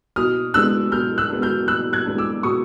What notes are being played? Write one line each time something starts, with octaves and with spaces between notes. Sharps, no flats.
B2 D#6 F6
G#3 B3 D4 E6 F#6
B2 F6 G6
E6 F#6
G#3 B3 D4
F6 G6
B2 E6 F#6
F#6 G#6
G#3 B3 D4
D6 E6
B2 C#6 D#6